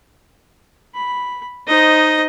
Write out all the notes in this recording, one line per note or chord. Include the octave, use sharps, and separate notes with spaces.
B5
D#4 C5 D#5